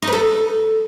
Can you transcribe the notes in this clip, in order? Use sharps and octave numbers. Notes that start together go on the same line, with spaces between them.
D#4
B4
A4